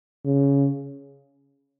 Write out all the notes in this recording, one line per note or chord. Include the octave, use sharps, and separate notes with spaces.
C#3